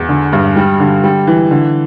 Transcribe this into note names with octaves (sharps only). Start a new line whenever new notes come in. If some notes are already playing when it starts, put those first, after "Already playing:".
Already playing: E2
D3
G2
G3
D3
G3
E3
D3